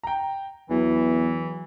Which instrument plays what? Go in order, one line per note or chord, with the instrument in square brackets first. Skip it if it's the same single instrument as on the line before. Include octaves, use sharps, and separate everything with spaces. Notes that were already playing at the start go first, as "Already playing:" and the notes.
[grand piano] G5 A#5
[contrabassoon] E2 [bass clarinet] E3 [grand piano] F#3